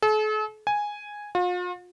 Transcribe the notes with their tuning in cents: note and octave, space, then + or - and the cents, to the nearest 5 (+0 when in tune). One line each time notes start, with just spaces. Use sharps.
A4 -45
G#5 -5
F4 +40